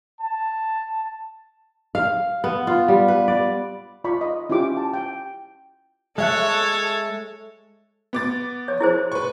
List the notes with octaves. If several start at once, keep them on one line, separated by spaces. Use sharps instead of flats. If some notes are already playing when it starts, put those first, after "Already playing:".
A5
F5
B3
F4
G3
B4
D5
F4 D5 B5 C#6
D#5
C#4 E4 F4 G4 D6
A5
G5
G#3 A4 C#5 E5 F#6
B3 D6 A6
C#5
E4 G#4 C5
B4 C#6